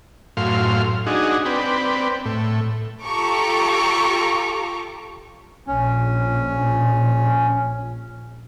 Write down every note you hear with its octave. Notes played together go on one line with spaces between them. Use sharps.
F#2 A2 F5 C6
D4 D#4 F#4 G#4
C4 B4 D5 G5
A2
F4 G4 A4 A#5 C#6 D6
A#1 C#4